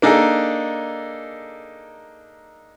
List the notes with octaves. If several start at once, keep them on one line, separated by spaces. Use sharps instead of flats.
A#3 D4 D#4 G#4 A4